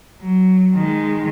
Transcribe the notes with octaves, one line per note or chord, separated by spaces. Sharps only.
F#3
D#3 G#3